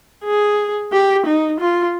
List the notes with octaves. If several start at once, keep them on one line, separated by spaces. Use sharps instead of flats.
G#4
G4
D#4
F4